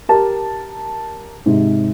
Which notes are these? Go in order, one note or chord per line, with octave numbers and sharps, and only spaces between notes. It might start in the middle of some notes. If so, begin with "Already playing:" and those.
G4 A#4 A5
G#2 C3